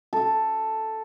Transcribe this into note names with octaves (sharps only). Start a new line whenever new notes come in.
A4